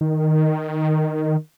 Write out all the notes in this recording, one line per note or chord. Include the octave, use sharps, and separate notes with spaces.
D#3